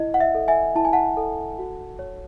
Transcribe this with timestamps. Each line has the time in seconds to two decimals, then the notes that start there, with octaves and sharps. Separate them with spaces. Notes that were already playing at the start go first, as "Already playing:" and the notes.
Already playing: E4 D#5
0.14 F#5
0.21 E5
0.35 A4
0.48 E5 G#5
0.75 E4 A5
0.85 G#5
0.93 F#5 A5
1.17 A4
1.59 F#4
1.99 C#5